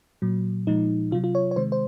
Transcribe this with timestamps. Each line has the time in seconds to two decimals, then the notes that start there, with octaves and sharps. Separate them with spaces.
0.22 A#2 F#3
0.67 A#2 F3 G#3 D#4
1.11 C3 F#3 F4
1.24 F4
1.35 C#5
1.51 C#5
1.56 C3 D#3 G#3 C5
1.72 C5